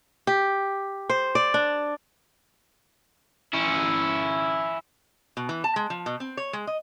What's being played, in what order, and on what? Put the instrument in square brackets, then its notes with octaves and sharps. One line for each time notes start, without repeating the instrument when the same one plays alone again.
[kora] G4
C5
D5
D4
[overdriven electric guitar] C#4 E4
[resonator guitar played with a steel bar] B2
E3
A5
G#3
F3
B2
C4
C#5
G#3
D#5